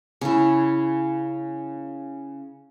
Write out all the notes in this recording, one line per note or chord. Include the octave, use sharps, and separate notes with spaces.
C#3 E4